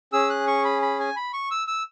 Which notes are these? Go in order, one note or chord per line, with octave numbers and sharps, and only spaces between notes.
C#4 G#4 E6
F#6
C#6
B5
B5
G#5
B5
C#6
E6
E6